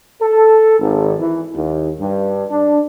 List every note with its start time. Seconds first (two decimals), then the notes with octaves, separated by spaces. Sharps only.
0.22 A4
0.80 G#1
1.20 E3
1.54 D#2
2.00 G2
2.51 D4